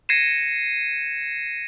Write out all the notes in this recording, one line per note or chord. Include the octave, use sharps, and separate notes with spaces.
G#6 A#6 C7 C#7 D#7 E7